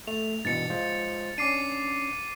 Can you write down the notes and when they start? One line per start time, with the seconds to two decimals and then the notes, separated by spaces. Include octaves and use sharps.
0.07 A3 F7
0.45 G2 B2 E3 A6 C#7
0.70 G#3 F4 C5
1.38 C#4 D4 D6 C7 D#7